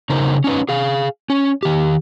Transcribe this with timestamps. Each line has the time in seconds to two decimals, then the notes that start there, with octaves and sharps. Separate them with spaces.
0.10 C#3 D#4 A#4 C5
0.44 C#4 D#4 B4
0.69 G#4 F5
1.30 C#4
1.63 D#3 G4